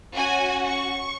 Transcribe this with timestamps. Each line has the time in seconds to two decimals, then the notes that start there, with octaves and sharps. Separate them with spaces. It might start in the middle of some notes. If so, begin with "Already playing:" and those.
0.15 C#4 F#4 G#5
0.67 C#6